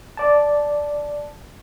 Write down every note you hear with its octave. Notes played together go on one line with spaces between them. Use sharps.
D5 A5